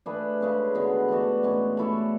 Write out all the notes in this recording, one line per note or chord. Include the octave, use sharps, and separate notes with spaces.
A3 D4 G#4 B4
C#3 G#3 C#4 G#4
D3 G#3 B3 F#4
E3 A3 D4 F#4
A2 G#3 C#4
A3 E4 A4 D5